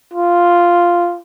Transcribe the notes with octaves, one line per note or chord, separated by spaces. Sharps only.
F4